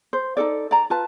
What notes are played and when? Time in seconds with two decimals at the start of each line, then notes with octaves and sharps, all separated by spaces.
0.13 C5
0.37 D#4 F4 A4 D5
0.71 D5 A#5
0.90 F4 B4 A5